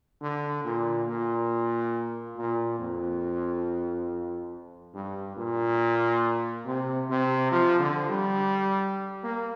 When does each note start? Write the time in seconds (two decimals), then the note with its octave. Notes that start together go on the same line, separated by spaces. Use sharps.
0.21 D3
0.65 A#2
1.08 A#2
2.37 A#2
2.79 F2
4.94 G2
5.37 A#2
6.66 C3
7.09 C3
7.52 F3
7.80 D3
8.09 G3
9.23 A#3